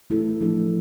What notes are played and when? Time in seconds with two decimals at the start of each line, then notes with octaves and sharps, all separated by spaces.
0.10 E3 A3 E4 A4
0.41 F3 A3 D4 A4